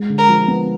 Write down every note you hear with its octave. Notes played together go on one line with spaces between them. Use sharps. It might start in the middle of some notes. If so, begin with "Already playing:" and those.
Already playing: G#3
D3
A#4
F3
B3